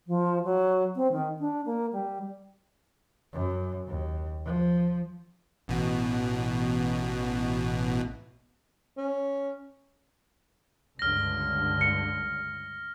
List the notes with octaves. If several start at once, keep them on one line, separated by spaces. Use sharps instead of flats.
F3
F#3
C4
D#3
D4
A#3
G3
F#2
D#2
F3
A1 B2
C#4
C#2 G2 D3 F6 A#6
C#7